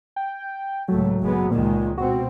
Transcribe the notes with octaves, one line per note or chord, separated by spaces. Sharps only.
G5
C#2 A2 F#3 A3
F#1 G#3 B3
C#2 A#2 D#3 G#3
B2 C4 F#4